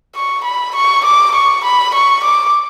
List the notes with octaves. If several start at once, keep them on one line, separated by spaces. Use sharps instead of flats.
C#6
B5
C#6
D6
C#6
B5
C#6
D6